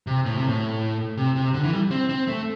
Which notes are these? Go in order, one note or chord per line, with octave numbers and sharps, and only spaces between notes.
C3
A2
C3
A2
C3
C3
D3
E3
G3
C4
C4
A3